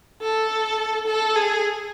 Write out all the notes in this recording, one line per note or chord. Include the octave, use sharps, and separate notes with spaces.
A4
A4
G#4